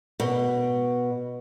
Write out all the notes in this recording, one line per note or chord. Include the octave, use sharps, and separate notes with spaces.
B2